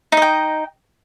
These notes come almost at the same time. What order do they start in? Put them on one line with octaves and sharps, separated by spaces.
D#4 D#5 G5